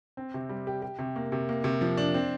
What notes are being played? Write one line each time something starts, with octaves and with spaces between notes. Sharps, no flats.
C4
C3
G3
G4
G4
C3
A#3
C3
A#3
C3
F3
D4
C4